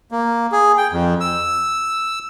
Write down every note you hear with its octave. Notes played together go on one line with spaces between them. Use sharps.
A#3
G#4
G5
F2
E6